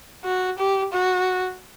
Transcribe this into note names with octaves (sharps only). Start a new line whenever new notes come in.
F#4
G4
F#4